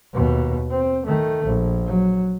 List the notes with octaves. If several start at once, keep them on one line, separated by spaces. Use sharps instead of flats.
D#2 B2
C4
D#3 A3
A#1
F#3